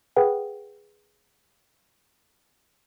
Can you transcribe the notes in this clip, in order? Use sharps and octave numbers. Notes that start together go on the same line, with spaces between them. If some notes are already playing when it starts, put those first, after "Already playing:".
G#4 B4 F#5 G5